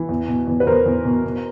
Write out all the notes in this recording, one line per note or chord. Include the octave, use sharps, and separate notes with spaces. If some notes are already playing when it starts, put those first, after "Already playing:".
Already playing: E3
E2
B2
E2
B4
E2 A#4 C5
E2
B2
B2